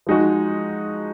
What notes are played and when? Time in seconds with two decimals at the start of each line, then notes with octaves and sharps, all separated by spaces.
0.07 F3 G#3 D#4 F#4